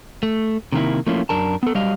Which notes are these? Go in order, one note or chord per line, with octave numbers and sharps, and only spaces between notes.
A3
C3 D#3 A#3 E4
F3 A3 A#3 C#4 E4 F4
F#2 D4 A#4 A5
B3 A4
F#3 G3 G4 D#5 F5